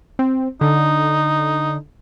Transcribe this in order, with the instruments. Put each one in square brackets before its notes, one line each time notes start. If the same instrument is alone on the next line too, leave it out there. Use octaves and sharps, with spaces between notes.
[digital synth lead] C4
[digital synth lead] D3 [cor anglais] D#4